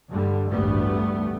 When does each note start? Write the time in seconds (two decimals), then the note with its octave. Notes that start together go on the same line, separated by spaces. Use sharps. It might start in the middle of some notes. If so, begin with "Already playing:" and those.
0.11 G2 D3 G3
0.50 A1 D2 G2 G3 A3 B3